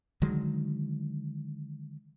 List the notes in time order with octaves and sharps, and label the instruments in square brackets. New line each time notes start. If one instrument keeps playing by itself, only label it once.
[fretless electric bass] D3 D#3 F#3 G#3